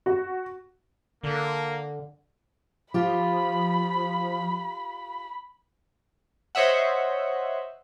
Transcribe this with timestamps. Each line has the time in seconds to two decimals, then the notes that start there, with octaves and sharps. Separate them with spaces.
0.06 F#4
1.23 D3 A#3
2.94 F3 F4 G4 B5
6.55 C5 C#5 D#5 E5 F#5